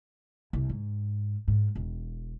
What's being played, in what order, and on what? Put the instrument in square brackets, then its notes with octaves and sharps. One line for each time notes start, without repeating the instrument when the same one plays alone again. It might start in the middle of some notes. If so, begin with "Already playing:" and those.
[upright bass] C2
G#2
G#2
E1